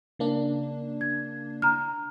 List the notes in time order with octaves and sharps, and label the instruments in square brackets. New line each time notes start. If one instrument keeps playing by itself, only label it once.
[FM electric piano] C#3 A#3 D4
[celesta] G#6
A#5 F6